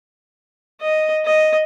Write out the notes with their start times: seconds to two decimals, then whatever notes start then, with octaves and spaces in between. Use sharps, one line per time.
0.81 D#5
1.25 D#5